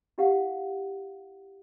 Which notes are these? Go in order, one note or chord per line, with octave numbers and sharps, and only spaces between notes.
E4 G4 F5 F#5